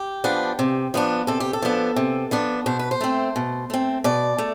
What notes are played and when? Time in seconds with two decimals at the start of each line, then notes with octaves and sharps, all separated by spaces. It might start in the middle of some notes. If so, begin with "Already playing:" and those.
Already playing: G4
0.24 F3 B3 D4
0.59 C3
0.94 F3 B3 D4
1.27 C3 A4
1.40 G4
1.53 A4
1.62 F3 B3 D4
1.96 C3
2.31 F3 B3 D4
2.66 B2 C5
2.79 B4
2.91 C5
3.01 A3 C4
3.36 B2
3.70 A3 C4
4.04 B2 D5
4.38 A3